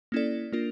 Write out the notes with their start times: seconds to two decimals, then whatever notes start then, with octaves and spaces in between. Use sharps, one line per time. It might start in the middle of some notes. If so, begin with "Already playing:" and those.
0.12 A#3 C#4 E4 A4 D5
0.52 A#3 D4 F4 A#4